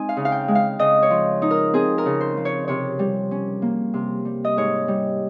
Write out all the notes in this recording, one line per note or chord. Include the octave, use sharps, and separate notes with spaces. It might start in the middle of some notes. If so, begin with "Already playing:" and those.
Already playing: G#3 C4 D#4 G#5
F5
C#3
F5
G5
G#3
F5
C#3 D#5
C#5
F3
D#4
A#4
C4 G#4
A#4
C#3
C5
F3
C#5
C3 C#5
G3
C#4
A#3
C3
G3
D#5
G#2 C#5
G3